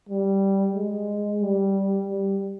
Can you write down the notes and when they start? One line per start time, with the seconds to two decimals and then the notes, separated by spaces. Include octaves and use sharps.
0.09 G3
0.75 G#3
1.42 G3
2.07 G3